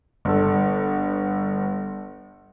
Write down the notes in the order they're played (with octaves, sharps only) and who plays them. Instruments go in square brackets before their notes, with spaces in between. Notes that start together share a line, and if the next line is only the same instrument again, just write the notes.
[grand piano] G1 A4